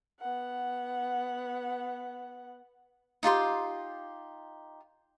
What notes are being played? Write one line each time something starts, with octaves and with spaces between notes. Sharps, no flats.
B3 F#5
D#4 F4 G4 C6